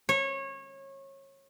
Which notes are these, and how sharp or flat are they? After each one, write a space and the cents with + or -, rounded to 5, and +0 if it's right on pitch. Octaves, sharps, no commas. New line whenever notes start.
C#5 -25